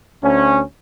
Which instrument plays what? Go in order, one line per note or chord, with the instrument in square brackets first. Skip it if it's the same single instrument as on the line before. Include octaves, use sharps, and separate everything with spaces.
[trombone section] D2 C#4